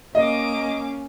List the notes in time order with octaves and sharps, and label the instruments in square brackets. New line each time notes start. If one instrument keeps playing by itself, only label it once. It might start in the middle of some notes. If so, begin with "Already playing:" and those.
[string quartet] A#3 D6 [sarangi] C#4 [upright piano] D#5